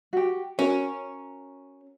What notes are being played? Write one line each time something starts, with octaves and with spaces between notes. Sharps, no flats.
F#4 G4
C#4 F#4 A#4